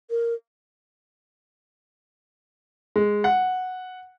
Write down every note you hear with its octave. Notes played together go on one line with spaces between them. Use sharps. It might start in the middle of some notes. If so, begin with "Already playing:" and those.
A#4
G#3
F#5